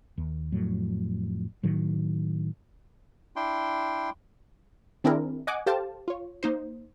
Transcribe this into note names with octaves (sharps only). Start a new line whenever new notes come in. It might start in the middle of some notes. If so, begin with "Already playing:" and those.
D#2
F2 A2 F#3
A2 D#3 F#3
D4 E4 G5 C6
D#3 C4 D4 E4 G#4 A#4
D#5 F#5 G#5 D6
G4 A4 C5 F5 G5 A5
F4 C#5
A#3 D#4 C5